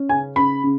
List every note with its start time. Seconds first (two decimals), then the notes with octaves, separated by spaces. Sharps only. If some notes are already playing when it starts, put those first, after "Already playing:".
Already playing: C#4
0.09 C#3 G#5
0.36 C#3 B5
0.64 C#3